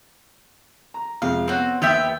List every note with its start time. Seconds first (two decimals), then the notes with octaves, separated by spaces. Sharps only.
0.94 A#5
1.22 F2 C3 G#3 F5
1.48 B3 C4 F#4 C#5
1.82 D#2 B3 G4 E5 C6